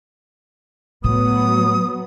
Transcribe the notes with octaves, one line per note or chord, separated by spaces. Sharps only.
A2 F#3 A3 B3 D#6